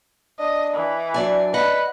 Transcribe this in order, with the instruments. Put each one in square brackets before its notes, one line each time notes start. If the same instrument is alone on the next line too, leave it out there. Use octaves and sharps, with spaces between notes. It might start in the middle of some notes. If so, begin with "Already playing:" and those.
[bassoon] D4 [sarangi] D#5
[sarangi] E3
[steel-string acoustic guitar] F#3 D5 G#5 [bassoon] D4
[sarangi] B4 [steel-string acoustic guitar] D#5 F#5